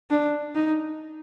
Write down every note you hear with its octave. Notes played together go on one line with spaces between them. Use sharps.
D4
D#4